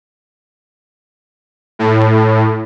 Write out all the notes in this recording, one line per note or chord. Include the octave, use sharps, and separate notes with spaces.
A2